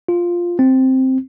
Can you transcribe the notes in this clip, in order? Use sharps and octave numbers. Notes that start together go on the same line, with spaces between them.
F4
C4